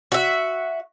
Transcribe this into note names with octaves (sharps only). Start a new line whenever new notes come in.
F#4 E5